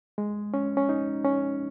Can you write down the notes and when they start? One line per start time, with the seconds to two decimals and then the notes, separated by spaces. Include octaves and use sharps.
0.18 G#3
0.54 C#4
0.77 C#4
0.89 D#4
1.25 C#4